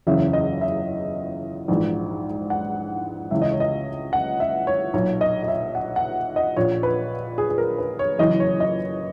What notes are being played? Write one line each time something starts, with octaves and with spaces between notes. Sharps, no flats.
F#1 E2 C#3 E3 E5
D#5
E5
A#1 G#2 E3
F#5
C#2 C#3 E3 E5
D#5
C#5
D#5
F#5
E5
C#5
B1 A#2 C#5
D#5
D#5
E5
F#5
F#5
D#5
A#1 A#2 C#5
B4
G#4
G#4
A#4
B4
C#5
F#1 F#2 E3 D#5
C#5
D#5